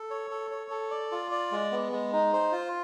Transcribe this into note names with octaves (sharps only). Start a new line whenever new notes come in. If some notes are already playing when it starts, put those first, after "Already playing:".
Already playing: A4
C#5
A4
C#5
A4
D5
F4
D5
G#3
B3
G#3
D#4
C5
F4